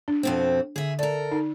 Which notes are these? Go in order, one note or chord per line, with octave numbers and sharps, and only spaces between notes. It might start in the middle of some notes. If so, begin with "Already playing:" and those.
D4
F2 B2 C4
D3 G#4 E5
A4 A#4 D5
D#4